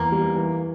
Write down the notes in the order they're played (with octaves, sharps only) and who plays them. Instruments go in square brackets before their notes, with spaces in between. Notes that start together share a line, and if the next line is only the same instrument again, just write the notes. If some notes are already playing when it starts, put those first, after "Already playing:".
Already playing: [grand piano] E2 [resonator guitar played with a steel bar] A#3
[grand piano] G3
E3